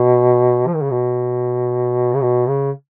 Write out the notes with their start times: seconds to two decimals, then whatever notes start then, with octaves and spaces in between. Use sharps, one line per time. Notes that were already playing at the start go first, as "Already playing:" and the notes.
Already playing: B2
0.67 F3
0.75 D#3
0.82 C#3
0.91 B2
2.15 C#3
2.22 B2
2.48 C#3